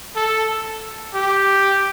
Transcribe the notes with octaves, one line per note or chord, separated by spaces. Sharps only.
A4
G4